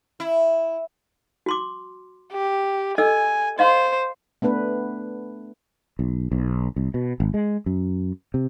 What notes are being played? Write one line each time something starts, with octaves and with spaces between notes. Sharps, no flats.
E4
F#4 C6 D6
G4
A4 D#5 G#5 E6
C5 D#5 F5 C6
A3 B3 D4 B4
B1
B1
C2
B2
G#1
G#3
F#2
C3